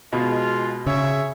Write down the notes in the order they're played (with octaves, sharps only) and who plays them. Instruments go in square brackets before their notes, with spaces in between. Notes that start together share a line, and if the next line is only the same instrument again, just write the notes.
[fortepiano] B2 [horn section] G#3 F4
[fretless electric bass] C#3 [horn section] G#4 C#5 E5